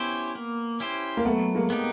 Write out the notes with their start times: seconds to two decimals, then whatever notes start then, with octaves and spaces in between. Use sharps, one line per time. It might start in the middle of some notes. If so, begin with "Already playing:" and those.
Already playing: B3 C#4 E4 G4 C5
0.35 A#3
0.80 C#4 E4 G4 C5
1.17 A#3
1.25 F#3 A3 B3
1.55 G#3 A#3
1.70 B3 D#4 G4